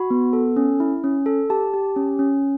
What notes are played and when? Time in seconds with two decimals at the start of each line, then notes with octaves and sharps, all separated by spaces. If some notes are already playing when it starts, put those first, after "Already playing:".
Already playing: F#4 B5
0.10 B3
0.33 A4
0.56 C#4
0.80 E4
1.04 C#4
1.26 A4
1.50 G4 A5
1.74 G4
1.96 C#4
2.19 C#4